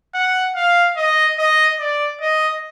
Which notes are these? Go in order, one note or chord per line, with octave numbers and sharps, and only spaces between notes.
F#5
F5
D#5
D#5
D5
D#5